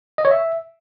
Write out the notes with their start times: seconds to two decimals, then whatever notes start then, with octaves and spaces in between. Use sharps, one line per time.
0.18 D#5
0.25 C#5
0.31 E5